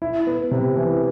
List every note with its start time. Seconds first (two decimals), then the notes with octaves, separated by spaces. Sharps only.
0.02 E4
0.27 B3
0.51 C3
0.76 E3